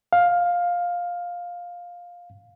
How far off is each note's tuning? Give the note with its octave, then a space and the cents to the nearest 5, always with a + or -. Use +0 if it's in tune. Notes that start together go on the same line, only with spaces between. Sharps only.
F5 +10